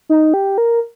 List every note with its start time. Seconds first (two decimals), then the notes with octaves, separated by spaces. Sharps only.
0.09 D#4
0.34 G4
0.58 A#4